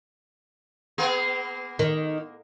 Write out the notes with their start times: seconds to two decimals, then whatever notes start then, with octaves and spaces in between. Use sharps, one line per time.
0.98 A#3 B3 G#4
1.79 D#3